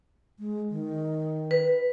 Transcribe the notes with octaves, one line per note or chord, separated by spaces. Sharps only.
G#3
D#3
B4